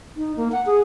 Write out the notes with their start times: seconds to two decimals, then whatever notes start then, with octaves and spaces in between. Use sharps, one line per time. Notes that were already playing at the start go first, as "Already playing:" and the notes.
0.17 D#4
0.36 A#3
0.52 F#5
0.66 G#4